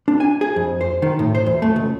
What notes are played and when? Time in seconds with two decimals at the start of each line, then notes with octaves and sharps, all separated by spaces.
0.08 D4
0.20 G#5
0.41 G#4
0.56 F2
0.81 C5
1.02 D#3
1.19 A2
1.35 C5
1.46 E2
1.62 A3
1.76 C#2